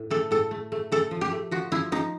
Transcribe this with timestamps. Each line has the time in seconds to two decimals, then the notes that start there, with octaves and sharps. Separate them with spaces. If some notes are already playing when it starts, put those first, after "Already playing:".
Already playing: A2
0.10 A3 A4
0.31 A2 A4
0.51 A3
0.72 A3
0.92 A3 A4
1.11 F3
1.21 G4
1.31 A3
1.51 F3 F#4
1.72 F3 E4
1.92 F3 D#4